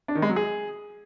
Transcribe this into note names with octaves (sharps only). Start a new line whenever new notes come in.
D4
D#3
G#3
F#3
G#4